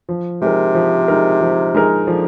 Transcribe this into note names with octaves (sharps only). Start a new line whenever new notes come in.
F3
C3 G#3 D#4 A#4
F3
G#3 D#4 A#4
F3
G#3 D#4 A#4
D3 F3